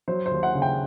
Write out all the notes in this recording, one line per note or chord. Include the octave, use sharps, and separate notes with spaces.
F#3 C5
C5
D#2
F#5
C#3
G5